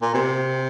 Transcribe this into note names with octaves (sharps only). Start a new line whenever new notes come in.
A#2
C3